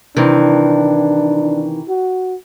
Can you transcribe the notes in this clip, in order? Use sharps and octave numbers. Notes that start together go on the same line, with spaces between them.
C3 D#3 E3 D4
F#4